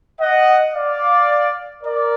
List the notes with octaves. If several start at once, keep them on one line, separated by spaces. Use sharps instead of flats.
D#5 F#5
D5 F5
A#4 D5